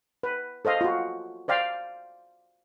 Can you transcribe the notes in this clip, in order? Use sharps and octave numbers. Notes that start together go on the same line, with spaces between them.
B4
A4 C5 D#5 F5
F4 F#4
C5 D5 F5 G5